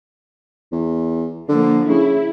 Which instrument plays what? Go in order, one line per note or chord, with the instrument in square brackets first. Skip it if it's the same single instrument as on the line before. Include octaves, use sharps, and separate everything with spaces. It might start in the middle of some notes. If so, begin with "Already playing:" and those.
[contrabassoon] E2
[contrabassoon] D3 [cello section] F3 A#3
[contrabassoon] C#3 [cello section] E4